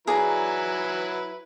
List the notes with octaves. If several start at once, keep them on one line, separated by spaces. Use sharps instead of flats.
F#3 E4 G#4 B4 D5 A#5